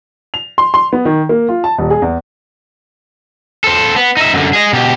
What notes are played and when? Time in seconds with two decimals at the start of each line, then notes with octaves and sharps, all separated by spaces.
0.34 F7
0.58 C6
0.74 C6
0.93 B3
1.05 D#3
1.29 A#3
1.49 F4
1.64 A5
1.79 D#1
1.90 G#4
2.02 E2
3.64 A4 C5
3.96 B3
4.17 D#4 E5
4.34 F#2 D3
4.53 G#4 D#5
4.73 B2 G4